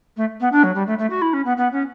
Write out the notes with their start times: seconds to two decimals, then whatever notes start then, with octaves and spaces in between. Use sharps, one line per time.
0.17 A3
0.40 B3
0.52 D4
0.63 F#3
0.75 G3
0.87 A3
0.98 A3
1.10 F#4
1.22 E4
1.33 C#4
1.45 B3
1.57 B3
1.72 C#4